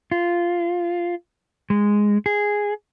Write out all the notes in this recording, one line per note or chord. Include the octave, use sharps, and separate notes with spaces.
F4
G#3
G#4